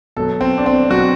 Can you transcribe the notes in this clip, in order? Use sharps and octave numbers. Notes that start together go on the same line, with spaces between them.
B2 F#3 A4
C4
D4
C4
B2 F#3 F#4